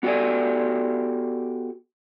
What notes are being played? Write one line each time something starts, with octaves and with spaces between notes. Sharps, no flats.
B3 F#4 G4 A4 D5 G#5